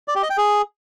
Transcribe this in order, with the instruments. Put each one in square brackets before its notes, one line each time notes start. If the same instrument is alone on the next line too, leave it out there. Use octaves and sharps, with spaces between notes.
[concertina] D5
G4
D#5
G5
G#4